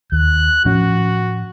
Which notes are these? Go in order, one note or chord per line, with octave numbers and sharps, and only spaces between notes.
D#2 F#6
A2 F3 C#4 F#4